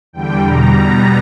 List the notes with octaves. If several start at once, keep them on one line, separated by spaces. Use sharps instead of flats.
E2 D3 G3 G5
E2 B2 G3 A#5
B2 G3 B3